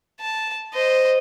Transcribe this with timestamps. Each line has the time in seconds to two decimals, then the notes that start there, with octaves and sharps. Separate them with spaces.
0.20 A5
0.74 C5 D#5